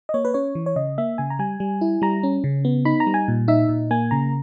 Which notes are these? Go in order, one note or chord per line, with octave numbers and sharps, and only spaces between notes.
D#5
A#3 C#5
B4
C#4 C#5
E3
C#5
C#3 D#5
A#3 E5
C#3 G#5
A#5
G3 G#5
G3
E4
G3 A#5
C#4
C#3
B3
D#4 B5
A#5
G3
G#5
A#2
D#4 E5
A#2
A#3 G#5
C#3 A#5